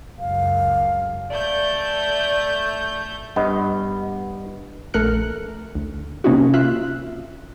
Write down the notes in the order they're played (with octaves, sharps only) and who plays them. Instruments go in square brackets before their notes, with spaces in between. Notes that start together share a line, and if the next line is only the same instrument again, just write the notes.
[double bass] C#2 F#2 [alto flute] F5
[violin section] A3 G6 [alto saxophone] D5
[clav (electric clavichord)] G2 B3 [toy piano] D#5
[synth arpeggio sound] A#1 A3 A#4 F6 F#6 C#7
D2
C3 A#3 C#4 D#4 E4 F#4
F4 E5 F#6